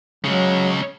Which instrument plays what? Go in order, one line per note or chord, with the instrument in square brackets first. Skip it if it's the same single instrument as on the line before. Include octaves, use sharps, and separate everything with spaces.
[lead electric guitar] C#3 G#3 [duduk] F#3